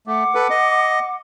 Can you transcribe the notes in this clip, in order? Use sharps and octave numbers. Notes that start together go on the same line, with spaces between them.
A3 F#5 D6
A4 B4
D#5